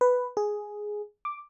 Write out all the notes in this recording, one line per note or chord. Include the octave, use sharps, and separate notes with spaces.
B4
G#4
D6